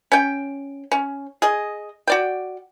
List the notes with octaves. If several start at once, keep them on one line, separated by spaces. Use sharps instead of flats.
C#4 G5
C#4
G#4 D#5
F#4 D5 G5